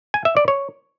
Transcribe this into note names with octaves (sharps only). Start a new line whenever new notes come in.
G#5
E5
D5
C#5